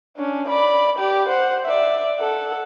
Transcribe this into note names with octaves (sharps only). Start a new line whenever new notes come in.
C#4 D4
D5 B5
G4 D5
C5 F#5
D5 E5
A4 F#5